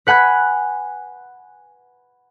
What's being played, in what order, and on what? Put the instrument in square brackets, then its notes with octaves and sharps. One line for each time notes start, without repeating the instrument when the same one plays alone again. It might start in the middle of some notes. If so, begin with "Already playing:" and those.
[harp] B4 F#5 G#5 B5 F#6